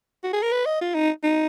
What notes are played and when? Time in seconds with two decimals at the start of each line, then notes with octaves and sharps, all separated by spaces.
0.24 F#4
0.33 G#4
0.43 A#4
0.52 B4
0.66 D#5
0.81 F4
0.95 D#4
1.24 D#4